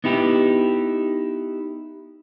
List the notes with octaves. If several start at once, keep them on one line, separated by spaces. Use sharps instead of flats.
B3 D#4 E4 G4